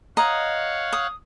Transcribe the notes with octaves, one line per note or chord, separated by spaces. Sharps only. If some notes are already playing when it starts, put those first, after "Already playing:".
C#5 D#5 F5 F#5 A#5
D#6